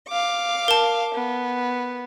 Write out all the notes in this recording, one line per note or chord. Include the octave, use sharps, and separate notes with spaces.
F5 D6
A#4 A5
B3